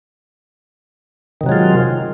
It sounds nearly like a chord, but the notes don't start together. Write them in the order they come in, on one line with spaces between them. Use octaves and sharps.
D#3 C3 F#3 G#3 F4